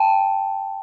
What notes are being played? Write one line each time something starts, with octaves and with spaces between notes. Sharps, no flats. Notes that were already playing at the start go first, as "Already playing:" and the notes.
Already playing: G5 A5